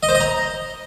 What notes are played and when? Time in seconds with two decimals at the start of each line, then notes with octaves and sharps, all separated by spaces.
0.03 D#5
0.09 C5
0.15 D#5
0.21 A#5